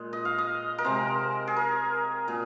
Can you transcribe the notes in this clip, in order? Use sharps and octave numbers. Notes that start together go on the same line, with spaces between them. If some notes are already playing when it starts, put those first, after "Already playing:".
Already playing: A#2 G#3
D#5
F5
D#5
A#4
C3 G#3 C5
G#4
A#4
A#2 G#4